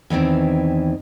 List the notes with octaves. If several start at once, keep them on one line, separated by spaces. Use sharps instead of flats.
E2 D#3 E3 C4